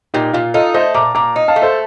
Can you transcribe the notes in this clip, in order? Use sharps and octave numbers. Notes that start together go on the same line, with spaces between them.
A#2 D#4 G4
A#2 F4
D#4 F4 A4
A3 C5 D#5
A#2 A#5 D6
A#2 A#5 D6
D#4
F5 A5
A3
A4 C5